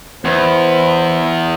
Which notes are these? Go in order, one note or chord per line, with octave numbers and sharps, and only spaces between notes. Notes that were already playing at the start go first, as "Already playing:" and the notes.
E2 C5